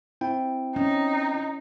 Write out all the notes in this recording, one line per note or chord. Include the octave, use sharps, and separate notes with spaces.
C4 E4 G5
C#4 D#4